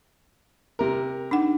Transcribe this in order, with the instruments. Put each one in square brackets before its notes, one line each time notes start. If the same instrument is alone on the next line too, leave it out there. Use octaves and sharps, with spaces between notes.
[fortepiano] C3 A#4
[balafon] D4 D#4 F#5